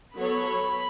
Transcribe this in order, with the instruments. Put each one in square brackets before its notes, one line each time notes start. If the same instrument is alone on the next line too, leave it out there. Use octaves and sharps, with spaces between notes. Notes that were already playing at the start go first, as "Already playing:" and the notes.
[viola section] F#3 B3 A4 C#5 [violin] B5